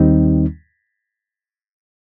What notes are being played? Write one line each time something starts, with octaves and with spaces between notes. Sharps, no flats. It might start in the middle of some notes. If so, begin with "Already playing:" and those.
Already playing: D#2 D#3 G3 C4 D#4